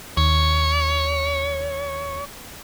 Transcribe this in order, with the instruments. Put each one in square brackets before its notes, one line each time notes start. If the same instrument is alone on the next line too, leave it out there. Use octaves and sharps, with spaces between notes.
[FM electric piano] D#2 [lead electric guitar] C#5